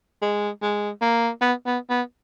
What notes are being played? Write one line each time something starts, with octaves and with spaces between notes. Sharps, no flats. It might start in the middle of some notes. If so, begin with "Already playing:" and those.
G#3
G#3
A#3
B3
B3
B3